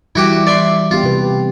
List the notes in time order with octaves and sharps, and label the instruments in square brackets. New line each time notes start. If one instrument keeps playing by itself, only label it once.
[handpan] E3 G3 [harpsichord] E4 F#4 G4
[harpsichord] D5 E5 C6
[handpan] B3 G4 [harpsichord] F4
[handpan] C3 B4